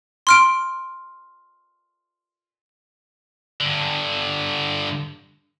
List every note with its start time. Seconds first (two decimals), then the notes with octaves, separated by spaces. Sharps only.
0.27 C6 F6 D7
3.61 G2 D3